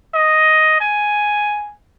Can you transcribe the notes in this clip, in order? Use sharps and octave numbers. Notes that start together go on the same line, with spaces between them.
D#5
G#5